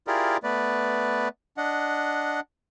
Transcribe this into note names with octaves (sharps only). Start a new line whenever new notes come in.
E4 F4 G4 G#4 A#4 D5
A3 B3 B4 D5
D4 D#5 F#5